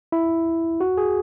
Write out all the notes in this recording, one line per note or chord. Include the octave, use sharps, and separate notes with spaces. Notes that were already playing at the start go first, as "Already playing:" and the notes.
E4
F#4
G#4